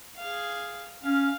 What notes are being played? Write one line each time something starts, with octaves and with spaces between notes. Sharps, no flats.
G#4 F5
C#4 F5